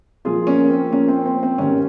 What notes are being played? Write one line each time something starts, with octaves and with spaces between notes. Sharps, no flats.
A#2 F3 F4 G#4
A#3 C#4
C4
A#3 C#4
C4
C4
C4
G#2 D#3 G3 A#3 C#4